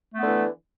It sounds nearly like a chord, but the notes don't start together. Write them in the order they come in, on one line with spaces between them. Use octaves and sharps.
A3 B3 D3 E3